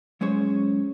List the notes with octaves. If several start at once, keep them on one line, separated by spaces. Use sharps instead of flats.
F#3 G#3 C#4 C5 C#5